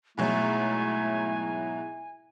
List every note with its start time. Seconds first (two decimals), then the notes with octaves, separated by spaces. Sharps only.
0.18 G#2 B2 F#3 A3 E4 G#5